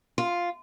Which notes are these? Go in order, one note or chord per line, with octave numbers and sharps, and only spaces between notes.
F4